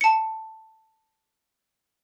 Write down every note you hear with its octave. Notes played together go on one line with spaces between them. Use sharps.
A5 C#7